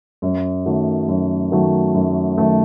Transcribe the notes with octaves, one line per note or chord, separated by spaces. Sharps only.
F#2
D#3 F#3 A3
F#2
D#3 F#3 A3
F#2
D#3 F#3 A3